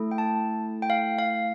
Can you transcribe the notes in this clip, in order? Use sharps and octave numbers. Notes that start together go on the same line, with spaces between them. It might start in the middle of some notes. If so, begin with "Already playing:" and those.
Already playing: A3 E4 A4
G5
A5
G5
F5
F5